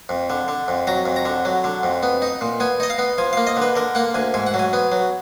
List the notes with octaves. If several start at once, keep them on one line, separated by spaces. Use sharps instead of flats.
F2
D3
D3
F2
F#3 A#5
F2
A#5
D3
F#3
D3
F2
B3
D#4
A#2
B3 G#5
D#4 D#5
F5
B3
F3 G#5
A#3 F5
D#5
D3 B4
D3 A#4
A#3 F#5
D2 G#5
G#2 G#5
F#5
F#3
G#5
B3
F#3